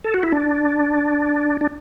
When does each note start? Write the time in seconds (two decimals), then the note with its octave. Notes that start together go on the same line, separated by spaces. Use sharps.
0.04 A4
0.14 F#4
0.23 E4
0.32 D4
1.61 D4